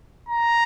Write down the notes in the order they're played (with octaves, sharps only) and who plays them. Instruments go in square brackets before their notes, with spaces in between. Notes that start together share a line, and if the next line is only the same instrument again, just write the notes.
[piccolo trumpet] A#5